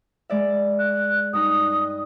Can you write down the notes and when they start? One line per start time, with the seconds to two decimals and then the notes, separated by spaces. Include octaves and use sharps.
0.30 G#3 D5 E5
0.79 F#6
1.33 G2 D#4 D#6 F#6